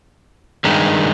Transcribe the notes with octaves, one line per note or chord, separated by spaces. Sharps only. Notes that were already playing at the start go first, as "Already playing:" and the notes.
G2 D#3 G#3